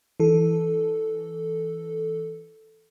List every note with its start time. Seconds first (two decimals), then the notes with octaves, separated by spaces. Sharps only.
0.20 E3 A4